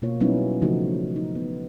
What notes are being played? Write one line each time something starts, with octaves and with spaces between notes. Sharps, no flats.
B2 A#3 F4 C#5
F#3 G3 B3 C#4 D#4 E4
C#3 E3 F3 A3 D#4 F#4
D#4
B3